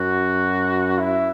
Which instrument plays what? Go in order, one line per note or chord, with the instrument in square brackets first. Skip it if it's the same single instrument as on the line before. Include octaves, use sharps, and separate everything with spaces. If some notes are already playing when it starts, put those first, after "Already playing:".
Already playing: [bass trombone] F#2 [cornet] F#4
[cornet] E4